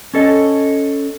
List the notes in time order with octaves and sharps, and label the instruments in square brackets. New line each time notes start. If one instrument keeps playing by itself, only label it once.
[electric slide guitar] C#4 A4 D#5